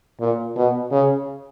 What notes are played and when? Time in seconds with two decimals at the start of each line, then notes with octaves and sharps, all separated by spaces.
0.20 A#2
0.56 B2
0.92 C#3